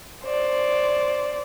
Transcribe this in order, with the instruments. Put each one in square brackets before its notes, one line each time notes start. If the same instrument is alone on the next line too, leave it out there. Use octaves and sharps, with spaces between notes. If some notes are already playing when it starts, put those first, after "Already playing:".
[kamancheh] C5 D5